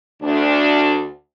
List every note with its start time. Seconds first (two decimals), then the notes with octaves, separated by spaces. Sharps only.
0.22 D2 D4